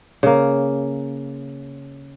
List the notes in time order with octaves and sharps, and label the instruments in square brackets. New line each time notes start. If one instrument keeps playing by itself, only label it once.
[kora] C#3 A#3